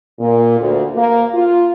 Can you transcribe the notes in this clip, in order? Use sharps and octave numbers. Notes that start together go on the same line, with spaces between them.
A#2
D2
A#3
F4